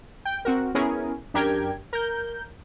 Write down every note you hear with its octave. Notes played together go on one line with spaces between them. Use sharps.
G5
C4 F#4 A#4
B3 C#4 E4 G#4 A#4
F#2 D4 G4 A#4 G5 G#6
A#4 G6